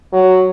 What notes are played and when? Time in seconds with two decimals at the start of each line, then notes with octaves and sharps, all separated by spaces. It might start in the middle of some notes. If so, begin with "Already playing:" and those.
0.13 F#3